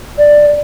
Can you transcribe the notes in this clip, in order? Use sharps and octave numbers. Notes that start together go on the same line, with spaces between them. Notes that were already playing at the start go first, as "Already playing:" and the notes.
D5